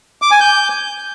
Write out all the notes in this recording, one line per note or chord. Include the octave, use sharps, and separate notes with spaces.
D6
G#5
G6